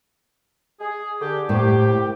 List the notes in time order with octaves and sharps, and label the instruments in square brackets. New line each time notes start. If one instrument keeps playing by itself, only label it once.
[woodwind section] G#4
D3 G4
[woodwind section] C2 G4 [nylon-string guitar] A2